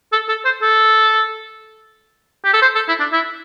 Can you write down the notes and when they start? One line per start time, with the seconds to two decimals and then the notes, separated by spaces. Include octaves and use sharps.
0.12 A4
0.28 A4
0.45 C5
0.62 A4
2.44 G4
2.54 A4
2.62 C5
2.75 A4
2.88 E4
3.00 D4
3.12 E4